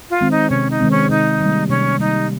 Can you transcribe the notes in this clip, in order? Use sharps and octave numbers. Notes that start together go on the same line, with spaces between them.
F4
D#3 G#3 C4
D#4
C3 C#4
D#4
D#3 G#3 C4
C#4
C3 D#4
D#3 G3 A#3
C3 C#4
D#3 G3 A#3 D#4